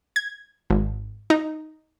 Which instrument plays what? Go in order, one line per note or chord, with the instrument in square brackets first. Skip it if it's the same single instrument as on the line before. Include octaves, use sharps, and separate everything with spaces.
[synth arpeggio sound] G#6
G#1
D#4